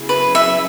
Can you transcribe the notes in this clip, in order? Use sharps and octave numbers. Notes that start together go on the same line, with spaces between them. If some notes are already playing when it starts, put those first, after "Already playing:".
Already playing: C#3 F#3 B3 E4 G#4
B4
E5